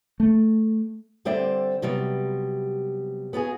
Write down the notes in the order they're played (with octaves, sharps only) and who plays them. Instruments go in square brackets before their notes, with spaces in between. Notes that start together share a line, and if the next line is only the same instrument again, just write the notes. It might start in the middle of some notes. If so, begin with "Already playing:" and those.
[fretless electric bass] A3
[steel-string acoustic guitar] D3 G3 C4 C5 D5 E5
C3 F#3 G3 B3
B3 F4 F#4 G#4